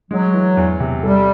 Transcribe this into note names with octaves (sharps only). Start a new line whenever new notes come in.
F#3 G#3
E3
E2
C3
G3 A4